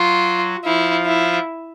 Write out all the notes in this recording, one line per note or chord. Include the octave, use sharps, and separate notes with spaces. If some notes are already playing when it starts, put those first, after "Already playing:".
Already playing: F#3 F4 F#4
F3 E4 F4
E4